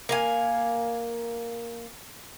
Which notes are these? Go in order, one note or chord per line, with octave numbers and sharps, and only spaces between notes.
A#3 F5 G#5